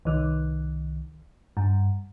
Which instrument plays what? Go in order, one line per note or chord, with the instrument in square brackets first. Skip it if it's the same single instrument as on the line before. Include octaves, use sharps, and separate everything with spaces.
[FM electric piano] C2 D#3
G2